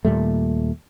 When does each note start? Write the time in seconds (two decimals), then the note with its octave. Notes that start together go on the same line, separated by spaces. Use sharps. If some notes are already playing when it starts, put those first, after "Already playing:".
0.05 D#2 A#2 G3 A3